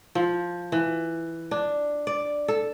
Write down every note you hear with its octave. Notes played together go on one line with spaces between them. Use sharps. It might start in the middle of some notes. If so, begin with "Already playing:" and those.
F3
E3
D4
D5
A4